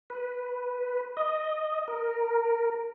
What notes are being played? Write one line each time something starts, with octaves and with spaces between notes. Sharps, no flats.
B4
D#5
A#4